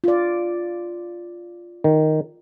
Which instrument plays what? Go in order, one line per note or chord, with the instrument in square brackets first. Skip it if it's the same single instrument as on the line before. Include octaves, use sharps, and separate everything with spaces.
[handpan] F4 D5
[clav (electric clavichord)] D#3